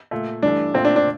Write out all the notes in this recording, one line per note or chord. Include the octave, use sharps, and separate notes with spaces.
A#2 A3
G2 E3 A3 D4
A#2 A3 C4
D4
D4